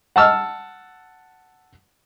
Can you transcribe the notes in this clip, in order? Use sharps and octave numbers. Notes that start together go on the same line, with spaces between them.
F#5 A5 E6 F6